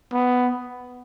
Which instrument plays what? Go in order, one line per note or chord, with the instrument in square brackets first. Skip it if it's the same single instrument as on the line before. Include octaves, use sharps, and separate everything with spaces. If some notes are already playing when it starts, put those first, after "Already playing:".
[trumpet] B3